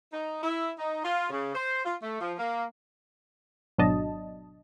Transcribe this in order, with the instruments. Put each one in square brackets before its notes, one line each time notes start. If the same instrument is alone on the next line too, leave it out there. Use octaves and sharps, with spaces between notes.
[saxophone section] D#4
E4
D#4
F4
C#3
C5
F4
A3
F3
A#3
[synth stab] G#1 B2 F#3 D4 D#5 A5